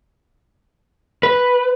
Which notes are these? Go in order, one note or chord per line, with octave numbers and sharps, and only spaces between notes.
B4